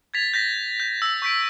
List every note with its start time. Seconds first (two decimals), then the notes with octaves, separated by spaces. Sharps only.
0.14 G#6 A6 B6 F7
0.34 G6 A#6 B6
0.80 G6
1.02 E6 B6
1.22 C#6 G6 B6 D7